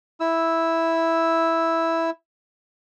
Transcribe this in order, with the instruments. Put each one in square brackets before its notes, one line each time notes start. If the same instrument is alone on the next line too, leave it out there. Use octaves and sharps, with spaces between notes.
[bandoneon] E4 E6